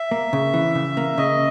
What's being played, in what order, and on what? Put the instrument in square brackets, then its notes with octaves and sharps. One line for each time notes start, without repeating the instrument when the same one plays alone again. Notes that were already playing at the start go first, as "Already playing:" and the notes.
Already playing: [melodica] E5
[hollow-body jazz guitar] A#3
C#3
E3
C#3
A#3
[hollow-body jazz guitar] C#3 [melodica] D#5